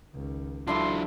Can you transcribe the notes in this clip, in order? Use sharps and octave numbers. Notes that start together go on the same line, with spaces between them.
C#2 D#3
F#3 D4 E4 F4 A4 C6